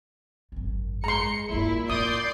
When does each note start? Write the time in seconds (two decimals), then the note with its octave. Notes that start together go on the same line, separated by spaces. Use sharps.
0.52 G#1 F#2
1.04 G#3 A#5 C6 C#7
1.49 A#1 G2 A#2 E4
1.90 A2 E3 D5 C6 D#6 G6